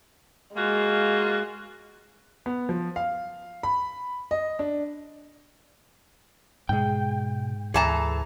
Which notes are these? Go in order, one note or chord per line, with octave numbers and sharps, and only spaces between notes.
G#3 A#3 F4 F#4
B3
F3
F5
B5
D#5
D4
G#2 B2 G#3 G5
D2 E3 G#4 A4 A5 A#5